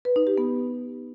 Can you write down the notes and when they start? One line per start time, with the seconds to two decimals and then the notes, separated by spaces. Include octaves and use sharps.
0.05 B4
0.16 D#4
0.27 G4
0.38 B3